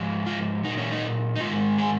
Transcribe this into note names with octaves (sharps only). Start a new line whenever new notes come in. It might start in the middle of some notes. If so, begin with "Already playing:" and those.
Already playing: G#2 F3 G#3
F4
A#2 F#3 D#4
C#4
D#4
D#4
G#2 D#3 G#3 F4
G#4